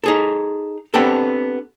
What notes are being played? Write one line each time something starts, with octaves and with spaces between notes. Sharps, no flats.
D#4 G#4 A4
B3 C4 D4 G4 A4